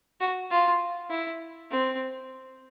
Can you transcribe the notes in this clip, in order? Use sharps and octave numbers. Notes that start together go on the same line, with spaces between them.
F#4
F4
E4
C4